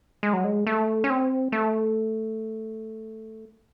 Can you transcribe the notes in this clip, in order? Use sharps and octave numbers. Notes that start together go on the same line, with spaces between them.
G#3
F#3
G#3
A3
C#4
C4
A3